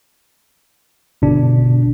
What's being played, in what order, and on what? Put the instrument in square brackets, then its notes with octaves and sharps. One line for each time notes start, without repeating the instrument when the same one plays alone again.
[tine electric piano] G1 B2 D4